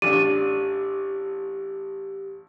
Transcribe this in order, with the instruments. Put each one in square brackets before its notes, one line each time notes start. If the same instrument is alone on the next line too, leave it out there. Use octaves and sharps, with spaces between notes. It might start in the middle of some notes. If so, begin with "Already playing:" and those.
[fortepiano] A1 D4 D5 [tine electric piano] G4 [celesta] D#7